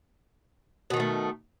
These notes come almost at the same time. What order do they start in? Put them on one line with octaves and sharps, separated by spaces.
B2 D#3 C4 A3